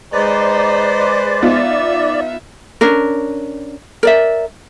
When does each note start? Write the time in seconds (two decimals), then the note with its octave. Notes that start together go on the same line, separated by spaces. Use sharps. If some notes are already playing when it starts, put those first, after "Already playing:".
0.13 G#3 D#4 B4 C5 D5
1.42 B3 D#4 F4 E5
2.81 C#4 D4 A#4
4.03 A#4 D5 E5